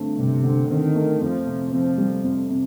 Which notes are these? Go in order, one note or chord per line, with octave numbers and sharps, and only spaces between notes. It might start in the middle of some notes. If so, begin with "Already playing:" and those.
Already playing: G2 D3 A3 C4
G2 C3
D3
D#3 C4
A3
F2 F3
C3
F3 C4
G3
F2
C3